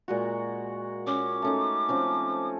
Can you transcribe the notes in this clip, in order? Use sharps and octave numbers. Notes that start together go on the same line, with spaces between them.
A#2 G#3 F#4
C#4 D6
A3 C#4 D#4
F3 C4 C#4